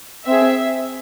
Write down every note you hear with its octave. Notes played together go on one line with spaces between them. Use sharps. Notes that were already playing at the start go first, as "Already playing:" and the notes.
C4 G#4 E5